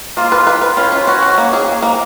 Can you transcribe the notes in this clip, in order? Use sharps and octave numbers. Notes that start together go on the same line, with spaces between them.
A#3 F4
B4
B4
B4
C#4 F4
B4
C#4 F#4
C#4
A#3
G#4
A#3
A#3